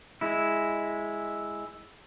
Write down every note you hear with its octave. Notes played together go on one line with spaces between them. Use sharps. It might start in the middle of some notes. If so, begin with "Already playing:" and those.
G#3 E4